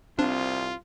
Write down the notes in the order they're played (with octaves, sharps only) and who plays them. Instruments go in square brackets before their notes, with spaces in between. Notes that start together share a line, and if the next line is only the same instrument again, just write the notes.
[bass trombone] C2 [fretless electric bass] C4 [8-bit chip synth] D4 [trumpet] F4